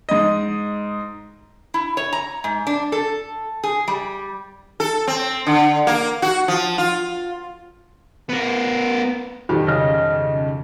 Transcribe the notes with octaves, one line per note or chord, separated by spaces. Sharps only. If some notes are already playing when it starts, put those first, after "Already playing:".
G#2 D#5
E4
C#5
A#5
G#2
D4
A4
G#4
G3
A4
C4
D3
A#3
F#4
F3
F4
B3 A#4
F2 B2 D#3 F3 G3 G4
C#3 D#5 F6